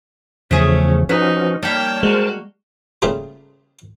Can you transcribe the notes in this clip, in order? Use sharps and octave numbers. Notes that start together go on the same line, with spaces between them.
E2 C#3 F3 A3 C#4 G#4
F3 C#4 D#4 F#4 B4
G3 A#3 C#5 G5 A5
G#3 F#4 A#4 C5 A5
C#3 G3 A3 A#3 F4 G#4